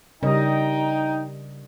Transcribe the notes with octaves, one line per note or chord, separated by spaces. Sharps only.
C#3 G3 D#4 A#4 D#5 G5